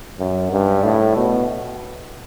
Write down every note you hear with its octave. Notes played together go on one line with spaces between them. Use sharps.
F#2
G2
A2
B2